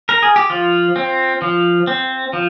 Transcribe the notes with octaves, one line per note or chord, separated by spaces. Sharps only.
A#4
G#4
G4
F3 F4
C4
F3
C4
F3